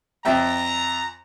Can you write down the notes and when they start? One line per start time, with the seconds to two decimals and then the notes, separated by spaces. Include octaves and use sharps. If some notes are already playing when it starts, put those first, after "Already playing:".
0.25 F2 E5 G5 A#5